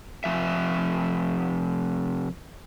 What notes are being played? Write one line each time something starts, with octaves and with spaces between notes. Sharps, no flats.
C3 F3 E5